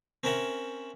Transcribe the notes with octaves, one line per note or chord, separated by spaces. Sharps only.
C4 C#4 A#4 E5 F#5